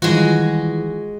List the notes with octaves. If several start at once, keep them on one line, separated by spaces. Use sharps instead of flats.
D#3 E3 G3 G#3 F4 F#4